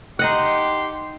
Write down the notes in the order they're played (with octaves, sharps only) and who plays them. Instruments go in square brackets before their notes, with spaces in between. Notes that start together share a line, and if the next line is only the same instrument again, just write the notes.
[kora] D#4 D#5 F#5 [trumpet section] G4 C6